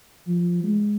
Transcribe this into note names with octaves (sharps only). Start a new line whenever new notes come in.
F3
G#3